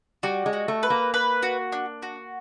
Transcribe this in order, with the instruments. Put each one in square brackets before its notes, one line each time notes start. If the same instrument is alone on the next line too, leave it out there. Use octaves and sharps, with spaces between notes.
[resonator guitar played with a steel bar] G3 [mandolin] F#4
[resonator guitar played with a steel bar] G#3
[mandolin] F#4
[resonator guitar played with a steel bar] A3
[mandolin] B4
[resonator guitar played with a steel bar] A#3
[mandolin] B4
F#4
D4
F#4